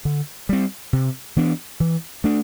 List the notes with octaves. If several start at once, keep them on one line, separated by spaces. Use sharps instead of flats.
D3
G3 C4
C3
E3 B3 D4
E3
A3 D4